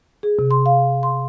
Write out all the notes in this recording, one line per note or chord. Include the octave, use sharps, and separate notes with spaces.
G#4
C3
C6
F5
C6